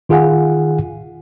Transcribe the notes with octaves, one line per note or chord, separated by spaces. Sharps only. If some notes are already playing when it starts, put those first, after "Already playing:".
D#3 F4 G#4 F5 F#5 G#5